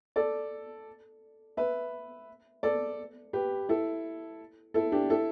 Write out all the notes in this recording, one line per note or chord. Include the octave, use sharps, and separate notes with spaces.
A4 D5
B4 E5
A4 D5
G4 B4
E4 A4
E4 A4
D4 G4
E4 A4